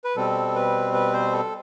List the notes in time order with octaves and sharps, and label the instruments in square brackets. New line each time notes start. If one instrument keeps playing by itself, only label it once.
[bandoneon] B4
B2 G3 C4 A4
B4
B4
C5
A4